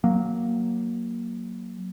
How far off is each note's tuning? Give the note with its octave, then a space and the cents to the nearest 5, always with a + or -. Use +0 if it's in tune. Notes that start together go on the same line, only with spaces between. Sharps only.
F#3 +0 A#3 +0